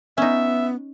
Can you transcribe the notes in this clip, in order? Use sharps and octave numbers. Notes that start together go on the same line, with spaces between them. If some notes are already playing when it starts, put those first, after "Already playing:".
B3 C#4 D#4 E5